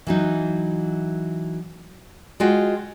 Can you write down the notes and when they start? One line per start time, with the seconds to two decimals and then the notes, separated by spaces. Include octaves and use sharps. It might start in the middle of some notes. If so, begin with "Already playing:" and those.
0.07 E3 F#3 D#4
2.40 G#3 F4 F#4 D#5 G5